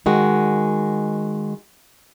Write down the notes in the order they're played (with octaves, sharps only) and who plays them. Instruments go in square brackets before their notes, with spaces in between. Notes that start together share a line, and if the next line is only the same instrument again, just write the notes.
[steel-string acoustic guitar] D#3 G#3 F#4